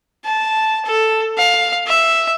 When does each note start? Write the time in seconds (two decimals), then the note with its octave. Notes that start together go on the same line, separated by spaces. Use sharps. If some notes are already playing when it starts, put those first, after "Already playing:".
0.25 A5
0.85 A4
1.38 F5
1.87 E5